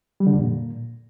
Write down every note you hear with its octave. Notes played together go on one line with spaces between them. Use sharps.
G3
D3
F2
A#2